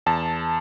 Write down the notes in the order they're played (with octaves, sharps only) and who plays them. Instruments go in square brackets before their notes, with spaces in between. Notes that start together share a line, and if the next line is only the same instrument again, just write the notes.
[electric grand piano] E2 A5